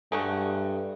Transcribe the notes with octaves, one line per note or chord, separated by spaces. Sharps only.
G2 G#3 A3 F#4 A4